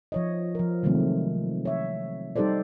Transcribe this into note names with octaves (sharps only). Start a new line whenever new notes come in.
F3 C#5 D#5
F3 A#4
C3 D#3 F#3 G#3 A3 C4
C#5 E5
G3 D#4 G4 A4 C5 D5